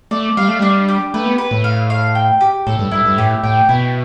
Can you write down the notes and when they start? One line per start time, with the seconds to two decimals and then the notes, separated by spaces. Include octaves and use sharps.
0.11 A3 D5
0.37 G3 F5
0.48 A3
0.59 G3 D4
0.89 G4
1.14 A3 B4
1.26 B3
1.38 B4
1.51 A2
1.64 F5
1.90 F5
2.15 G5
2.41 G4
2.67 A2 A4
2.79 G2
2.91 G2 E4
3.05 G2
3.17 A2 G4
3.44 A2 G5
3.69 B2 E4